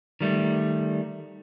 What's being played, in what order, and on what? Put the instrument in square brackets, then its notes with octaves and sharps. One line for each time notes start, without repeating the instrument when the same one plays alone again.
[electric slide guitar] D#3 G3 A3